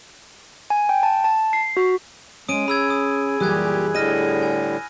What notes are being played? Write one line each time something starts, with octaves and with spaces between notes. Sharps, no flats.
G#5
G5
A5
A5
C7
F#4
G#3 C#4 D#6 D7 D#7
G#4 B5 E6 G#6
D#6
F#2 A#2 E3 G3 G4 D#6 F#6 G#6
A2 D3 G3 D#5 F6 A#6 D#7
G#5